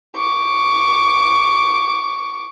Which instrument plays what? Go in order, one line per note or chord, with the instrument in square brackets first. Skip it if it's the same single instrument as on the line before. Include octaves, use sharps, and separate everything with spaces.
[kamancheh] C#6 D6